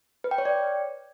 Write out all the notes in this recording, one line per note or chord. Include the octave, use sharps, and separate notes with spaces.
B4
G5
C#5
D5